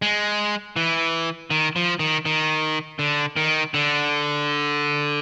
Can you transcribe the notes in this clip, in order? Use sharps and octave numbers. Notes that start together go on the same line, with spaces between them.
G#3
E3
D#3
F3
D#3
D#3
D3
D#3
D3